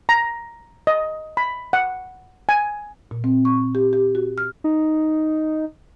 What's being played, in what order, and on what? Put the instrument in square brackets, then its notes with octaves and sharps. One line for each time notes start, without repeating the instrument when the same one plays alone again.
[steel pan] A#5
D#5
B5
F#5
G#5
[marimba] A#2
C4
C#6
G4
G4
F#4
F6
[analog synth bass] D#4